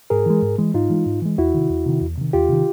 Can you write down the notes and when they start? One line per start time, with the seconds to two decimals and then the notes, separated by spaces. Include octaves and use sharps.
0.10 G#2 G#4 A#4
0.26 E3 G#3
0.42 G#2
0.59 E3 G#3
0.74 G#2 D#4 F4
0.90 E3 G#3
1.06 G#2
1.22 E3 G#3
1.38 E2 E4 F#4
1.54 C3 D#3
1.70 E2
1.86 C3 D#3
2.02 E2
2.17 C3 D#3
2.33 E2 F4 G4
2.49 C3 D#3